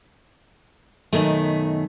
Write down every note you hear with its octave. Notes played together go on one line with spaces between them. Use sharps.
F#2 B2 D#3 A3